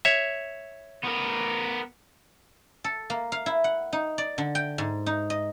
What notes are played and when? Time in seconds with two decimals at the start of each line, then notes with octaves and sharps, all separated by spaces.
0.05 C#5 E5
1.04 B3 A#4
2.84 A4
3.10 A#3
3.32 F5
3.46 E4
3.64 F#5
3.93 D#4
4.18 D5
4.38 D3
4.55 G5
4.78 G#2
5.06 D#4
5.30 D#5